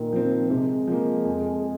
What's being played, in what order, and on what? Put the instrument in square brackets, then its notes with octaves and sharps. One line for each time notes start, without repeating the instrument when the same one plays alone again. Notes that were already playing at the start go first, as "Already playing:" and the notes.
Already playing: [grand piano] A#2 [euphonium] D#3
[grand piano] F3 C4
[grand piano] C3 [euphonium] G#3
[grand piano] F3 A#3
F2